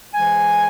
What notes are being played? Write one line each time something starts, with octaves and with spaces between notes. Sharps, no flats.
G#2 E3 G#3 G#5